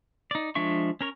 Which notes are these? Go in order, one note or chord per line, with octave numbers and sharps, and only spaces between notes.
D#4 D5
F3 G#3 D4 E5 C#6
C#4 A#4 C#5